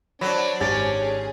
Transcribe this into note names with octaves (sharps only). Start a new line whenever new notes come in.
F#3 D4 C5 D5 B5
G#1 C#4 G4 A6
G#4